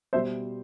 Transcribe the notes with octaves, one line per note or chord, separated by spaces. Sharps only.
B2 G3 C5 E5